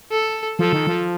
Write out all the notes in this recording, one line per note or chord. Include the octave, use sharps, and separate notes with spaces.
A4
F3 A4
D#3
F3